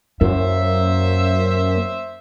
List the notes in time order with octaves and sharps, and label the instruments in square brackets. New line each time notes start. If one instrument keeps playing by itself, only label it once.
[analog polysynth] F#2 [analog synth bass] A#3 [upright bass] E4 [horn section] C5 E5